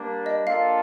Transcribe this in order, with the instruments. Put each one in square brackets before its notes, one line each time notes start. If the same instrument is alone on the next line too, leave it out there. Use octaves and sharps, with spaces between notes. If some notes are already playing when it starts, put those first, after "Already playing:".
Already playing: [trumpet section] G3 A#3 D4
[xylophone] D#5
[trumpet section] A#3 D4 F4 A4 [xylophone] F5